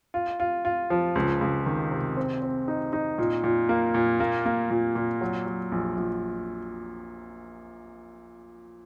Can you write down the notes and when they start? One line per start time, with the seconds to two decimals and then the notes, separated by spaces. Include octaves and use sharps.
0.14 F4
0.40 F4
0.65 F4
0.90 F3
1.15 C#2
1.41 C#2
1.66 D#3
1.91 C3
2.17 C4
2.42 C4
2.68 D#4
2.93 D#4
3.18 A#2
3.44 A#2
3.69 A#3
3.94 A#2
4.20 A#3
4.46 A#3
4.70 A#2
4.95 A#2
5.21 F#3
5.46 F#3
5.72 A#1
5.97 A#1